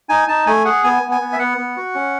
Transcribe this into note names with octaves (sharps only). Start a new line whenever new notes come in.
D#4 G#5
D#4 A5
A3 G#5
G#4 F#5
B3 G#5
B3
G#5
B3
E5
B3 F#5
B3
F#4
C#4